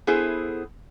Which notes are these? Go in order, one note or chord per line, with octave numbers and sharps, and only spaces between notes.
B3 E4 G#4 A4 C5